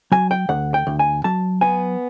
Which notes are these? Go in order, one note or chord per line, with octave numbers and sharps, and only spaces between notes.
F#3 G#5
G5
D2 F#5
G5
D2
G#5
F#3 A5
B3 G#5